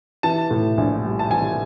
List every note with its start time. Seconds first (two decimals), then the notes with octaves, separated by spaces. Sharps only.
0.23 E3 A5
0.51 A2
0.77 A#1
1.04 G3
1.19 A5
1.31 E3 G#5